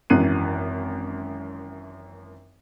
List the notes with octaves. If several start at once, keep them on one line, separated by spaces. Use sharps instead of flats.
G#1 F#2 E3 F#6 C7 D#7